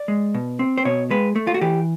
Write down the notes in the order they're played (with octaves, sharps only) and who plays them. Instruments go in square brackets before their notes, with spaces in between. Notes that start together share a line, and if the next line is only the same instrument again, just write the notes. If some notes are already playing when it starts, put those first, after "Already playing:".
Already playing: [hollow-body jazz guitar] D5
G#3
B2
C4
C5
B2 C#5
G#3 B4
A3
F4
F#4
E3 G4